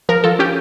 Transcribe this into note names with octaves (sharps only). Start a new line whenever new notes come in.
F3 A#4
F3 A4
C#4 G4